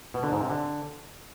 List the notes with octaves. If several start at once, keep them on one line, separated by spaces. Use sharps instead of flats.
B2
D3
G#2
C3
D3